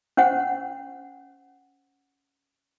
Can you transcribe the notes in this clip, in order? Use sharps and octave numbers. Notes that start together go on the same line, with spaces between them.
C#4 C5 F#5